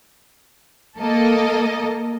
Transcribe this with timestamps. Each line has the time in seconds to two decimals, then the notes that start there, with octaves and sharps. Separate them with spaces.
0.98 A#3 A4 D#5